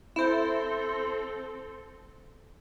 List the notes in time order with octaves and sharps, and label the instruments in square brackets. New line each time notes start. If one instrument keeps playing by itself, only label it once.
[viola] C4 A4 [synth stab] E4 C5